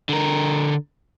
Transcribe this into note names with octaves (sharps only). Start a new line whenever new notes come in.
D3 A#4